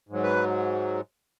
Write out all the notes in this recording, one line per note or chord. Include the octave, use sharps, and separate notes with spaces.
G#2 F#3
B4